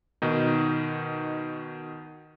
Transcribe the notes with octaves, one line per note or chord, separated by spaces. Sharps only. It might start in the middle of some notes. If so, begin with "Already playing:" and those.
B2 D#3 D#4